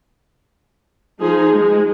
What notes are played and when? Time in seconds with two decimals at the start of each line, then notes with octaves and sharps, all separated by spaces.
1.19 F3 D#4 G#4
1.52 G#3